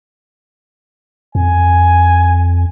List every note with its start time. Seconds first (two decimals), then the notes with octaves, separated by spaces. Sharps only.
1.35 F2 G#5